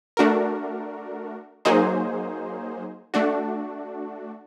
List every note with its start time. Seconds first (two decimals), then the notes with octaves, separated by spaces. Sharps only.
0.17 A3 D4 F#4 A#4
1.65 F#3 A#3 D#4 G#4 C5
3.14 A3 D4 F#4